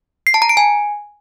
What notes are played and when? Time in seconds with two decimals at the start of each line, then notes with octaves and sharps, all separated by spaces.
0.27 C7
0.34 A5
0.42 A#5
0.49 D7
0.57 G#5